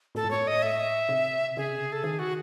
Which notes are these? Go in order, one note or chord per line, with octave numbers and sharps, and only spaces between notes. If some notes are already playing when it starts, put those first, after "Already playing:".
A2 A4
G#2
A2 C#5
D#5
E5
C3
C#3 G#4
C3
C#3
A4
D#3 G#4
F#4